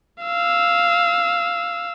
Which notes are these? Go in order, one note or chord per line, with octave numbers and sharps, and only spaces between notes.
F5 E6